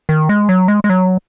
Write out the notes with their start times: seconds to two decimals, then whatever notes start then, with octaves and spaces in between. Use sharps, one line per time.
0.09 D#3
0.29 G#3
0.49 F#3
0.68 G#3
0.84 G#3
0.90 F#3